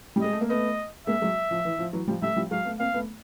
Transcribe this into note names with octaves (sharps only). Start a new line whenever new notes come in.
G3
G#3 D#5
A3
A#3
A3 B3 D#5
G#3 A#3 E5
F#3 G#3
F3
E3
F3
E3 F#3
F3 G3
G3 A3 E5
F3 G3
F#3 G#3 F5
A3 B3
A#3 C4 F5
A3 B3